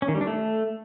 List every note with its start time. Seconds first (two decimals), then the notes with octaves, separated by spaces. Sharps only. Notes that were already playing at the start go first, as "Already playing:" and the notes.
0.02 C#4
0.08 D#3
0.15 G3
0.21 D4
0.27 A3